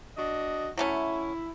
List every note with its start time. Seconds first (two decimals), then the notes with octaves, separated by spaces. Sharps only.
0.17 D4 F#4 D#5
0.78 F#3 A3 C#4 E4